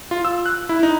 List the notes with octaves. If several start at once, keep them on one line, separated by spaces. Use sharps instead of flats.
F4
E6
F#6
E4
D#4